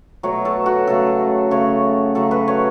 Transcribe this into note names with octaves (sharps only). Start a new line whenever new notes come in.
B2 F#3 A3 C#5
A4
F#4
C#3 F#3 A3 A4
C#3 A3 C#5
C#3 F#3 A3 A4
B4
C#5